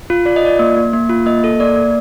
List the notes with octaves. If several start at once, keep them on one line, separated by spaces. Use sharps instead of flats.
F4
F4 D5
D#5
F4 D5
A#3
A#3
A#3
F4
A#3 D#5
A4
A#3 D5
A#3